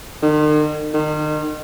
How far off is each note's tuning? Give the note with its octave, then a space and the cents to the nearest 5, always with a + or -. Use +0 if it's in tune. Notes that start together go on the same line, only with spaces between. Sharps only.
D#3 -45
D#3 -35